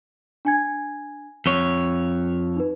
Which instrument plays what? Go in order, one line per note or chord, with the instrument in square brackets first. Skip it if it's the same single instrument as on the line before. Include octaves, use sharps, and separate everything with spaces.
[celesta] D4 G#5 G#6
[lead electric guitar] F2 C#5 [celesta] G7
[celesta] D#4 B4